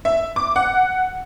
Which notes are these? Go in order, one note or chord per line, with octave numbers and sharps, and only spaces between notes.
E5
D6
F#5